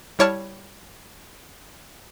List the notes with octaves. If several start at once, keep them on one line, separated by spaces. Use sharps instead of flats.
G3 E4 C#5 D5 A5 F6